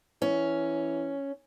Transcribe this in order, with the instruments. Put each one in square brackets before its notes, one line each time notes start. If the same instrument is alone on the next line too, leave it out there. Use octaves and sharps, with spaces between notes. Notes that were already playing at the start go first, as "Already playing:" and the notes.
[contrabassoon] E3 [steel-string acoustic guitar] C#4